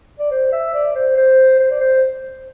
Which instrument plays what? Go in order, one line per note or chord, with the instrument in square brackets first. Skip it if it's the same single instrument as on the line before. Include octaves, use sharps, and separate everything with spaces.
[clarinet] D5
C5
E5
D5
C5
C5
C5
D5
C5